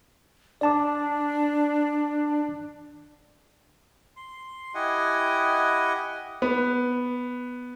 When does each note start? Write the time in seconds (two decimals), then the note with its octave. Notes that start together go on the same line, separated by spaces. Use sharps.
0.61 D4 D5 A5 D6
4.16 C6
4.74 E4 G4 D#5 F#5 G#5
6.42 B3